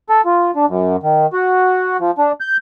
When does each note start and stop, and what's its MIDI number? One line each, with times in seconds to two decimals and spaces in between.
0.09 0.21 69
0.25 0.51 65
0.56 0.65 62
0.68 0.96 42
1.03 1.26 51
1.33 1.97 66
2.00 2.11 53
2.18 2.32 62
2.40 2.57 91